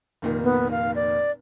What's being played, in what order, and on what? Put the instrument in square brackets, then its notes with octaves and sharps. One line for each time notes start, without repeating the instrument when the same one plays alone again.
[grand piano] F1 A#2 D#3
[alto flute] B3
F5
D5